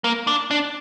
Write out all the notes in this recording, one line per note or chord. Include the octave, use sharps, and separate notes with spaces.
A#3
D4
D4